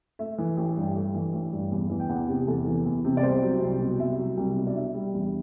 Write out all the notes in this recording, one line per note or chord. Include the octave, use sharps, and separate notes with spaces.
A3 E5
E3
A1
G2
A3
E3
A1
G2
E2
E3
G5
E2 F#5
C3 G4
E2 A4
E3
E2
C3
D5
C2 C5
F#3
C2
B2
C2 E5
F#3
C2
B2
D5
D4 E5
G3
E2